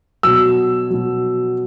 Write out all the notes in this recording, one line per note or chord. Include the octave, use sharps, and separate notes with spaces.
B2 F#3 E6
B2 F#3